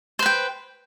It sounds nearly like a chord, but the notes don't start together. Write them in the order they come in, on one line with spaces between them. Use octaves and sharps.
C5 B4 G5